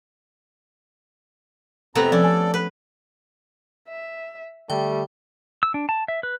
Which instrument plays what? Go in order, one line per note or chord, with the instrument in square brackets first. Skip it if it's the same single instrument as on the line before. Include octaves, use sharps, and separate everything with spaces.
[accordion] F2 A#5 [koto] C3 A3 B3
[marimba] F3 [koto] C#4 [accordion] A4 D5
[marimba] G#5
[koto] B4
[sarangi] E5
[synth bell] D3 G5 [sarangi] G3 [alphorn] A3
[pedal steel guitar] E6
D4
A5
E5
B4